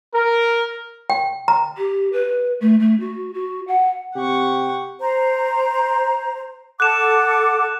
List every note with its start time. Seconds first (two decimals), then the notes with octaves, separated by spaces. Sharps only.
0.14 A#4
1.10 G5
1.48 A#5
1.77 G4
2.12 B4
2.60 A3
2.79 A3
3.00 F#4
3.34 F#4
3.68 F#5
4.15 C3 G4 F#5 C#6
5.00 C5 A#5
6.80 A4 F#5 D6 F#6 E7